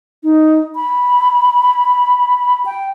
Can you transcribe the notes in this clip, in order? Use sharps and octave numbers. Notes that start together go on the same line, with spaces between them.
D#4
B5
G5